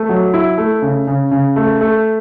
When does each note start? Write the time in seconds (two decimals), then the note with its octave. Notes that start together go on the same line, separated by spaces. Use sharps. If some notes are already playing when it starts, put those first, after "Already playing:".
Already playing: A3
0.09 F#3
0.34 E4
0.58 A3
0.82 C#3
1.07 C#3
1.32 C#3
1.56 A3
1.81 A3